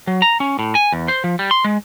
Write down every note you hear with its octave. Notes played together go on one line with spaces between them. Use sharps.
F#3
A#5
C#4
A2
G#5
E2
C5
F3
G3
C6
G#3